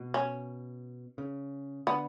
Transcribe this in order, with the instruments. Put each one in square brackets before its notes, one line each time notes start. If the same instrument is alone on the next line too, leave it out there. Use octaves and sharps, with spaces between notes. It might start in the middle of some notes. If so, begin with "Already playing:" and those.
Already playing: [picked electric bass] B2
[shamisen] C#4
[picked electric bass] C#3
[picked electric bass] D3 [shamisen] B3